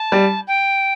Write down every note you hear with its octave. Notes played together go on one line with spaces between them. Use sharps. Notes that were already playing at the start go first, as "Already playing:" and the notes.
Already playing: A5
G3
G5